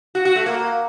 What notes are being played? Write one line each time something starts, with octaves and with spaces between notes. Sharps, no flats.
F#4
F#4
A3
A#3